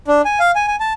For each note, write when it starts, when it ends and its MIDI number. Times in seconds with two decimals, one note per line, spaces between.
0.08 0.22 62
0.25 0.39 80
0.40 0.51 77
0.55 0.68 80
0.68 0.76 80
0.80 0.93 81